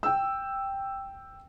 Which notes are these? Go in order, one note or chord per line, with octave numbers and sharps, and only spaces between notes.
G5 E6